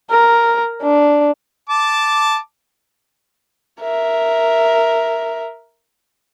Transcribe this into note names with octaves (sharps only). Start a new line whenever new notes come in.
A#4
D4
A5 D6
A#4 E5